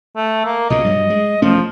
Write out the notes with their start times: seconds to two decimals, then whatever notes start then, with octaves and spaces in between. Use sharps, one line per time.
0.16 A3
0.45 A#3
0.70 B1 A#2 C#3 D#5
0.84 G2 F#3
1.10 G#3
1.42 E1 F3 A3 C#4